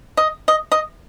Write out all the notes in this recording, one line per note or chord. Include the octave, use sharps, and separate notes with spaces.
D#5
D#5
D#5